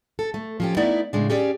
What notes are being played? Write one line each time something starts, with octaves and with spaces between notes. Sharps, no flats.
A4
A3
F3 C#4 G4
A3 B3 D#4 E4 D5 E5
A2 C#3 G#3 D4
C#4 G4 G#4 D5